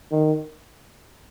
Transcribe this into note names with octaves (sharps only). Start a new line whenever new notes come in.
D#3